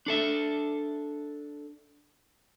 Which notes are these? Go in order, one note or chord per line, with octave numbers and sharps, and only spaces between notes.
D4 A4 E5